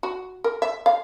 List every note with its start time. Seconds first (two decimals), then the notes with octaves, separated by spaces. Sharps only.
0.03 F#4
0.44 A#4
0.62 E5
0.86 F5